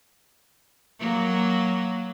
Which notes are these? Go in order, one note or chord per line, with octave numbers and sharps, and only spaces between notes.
F#3 A#3